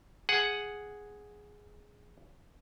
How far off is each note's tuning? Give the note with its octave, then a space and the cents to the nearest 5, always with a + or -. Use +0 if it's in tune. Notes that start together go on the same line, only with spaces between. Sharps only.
G#4 +0 F#5 +0